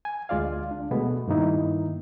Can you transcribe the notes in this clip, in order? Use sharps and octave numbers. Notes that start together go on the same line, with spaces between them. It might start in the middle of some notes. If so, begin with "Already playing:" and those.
G#5
D2 G#3 F4 D5 F5
D4
B2 G#3 A3 B3
G2 D#3 A#3 D#4 E4